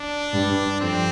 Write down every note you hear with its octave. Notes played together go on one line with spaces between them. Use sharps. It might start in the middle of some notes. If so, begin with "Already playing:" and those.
Already playing: D4
G2
F2 C4